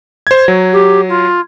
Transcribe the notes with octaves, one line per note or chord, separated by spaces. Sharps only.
C5 G#6
F#3
G4
F4